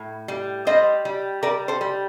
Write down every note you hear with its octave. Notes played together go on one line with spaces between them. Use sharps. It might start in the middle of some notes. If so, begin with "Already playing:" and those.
Already playing: A2
G3
G3 C5 D#5
G3
G3 A#4 D5
A4 C5
G3